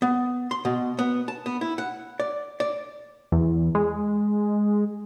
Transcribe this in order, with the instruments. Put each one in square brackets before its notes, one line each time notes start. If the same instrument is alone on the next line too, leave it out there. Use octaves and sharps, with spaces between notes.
[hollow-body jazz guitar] B3
C6
B2
B3
A5
B3
E4
F#5
D5
D5
[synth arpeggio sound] E2
G#3